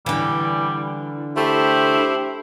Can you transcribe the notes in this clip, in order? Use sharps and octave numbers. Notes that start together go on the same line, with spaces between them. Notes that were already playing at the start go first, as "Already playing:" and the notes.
D3 E3 G3
A3 E4 G4 C5